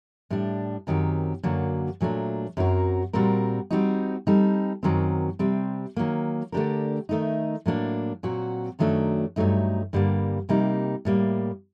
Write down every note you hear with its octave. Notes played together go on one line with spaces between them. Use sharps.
A2 G3 D4
F#2 D#3 F#3 C4 G4
F#2 D3 F#3 A#3 F#4
A#2 F#3 A3 D4
F#2 F#3 C4 F#4 A#4
A#2 G3 C4 F#4 A#4
G3 C4 D#4 F#4
G3 C4 D#4 A4
F#2 D#3 F#3 C4
C3 G3 C4
D#3 F#3 A#3
D3 A3 D4 G4 A#4
D#3 A3 D#4
A2 F#3 A#3 D4
A#2 F#3 C4 F#4
F#2 D#3 F#3 A3 D4
G2 F#3 A3 D#4
G2 D3 G3 A#3
C3 G3 A#3 D#4
A2 G3 A#3